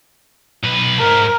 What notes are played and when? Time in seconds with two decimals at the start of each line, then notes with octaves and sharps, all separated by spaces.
0.64 B1 B4
1.00 G#2 A#4